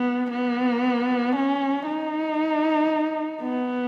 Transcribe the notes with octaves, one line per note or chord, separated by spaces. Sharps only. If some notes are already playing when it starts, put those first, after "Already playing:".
Already playing: B3
B3
C#4
D#4
B3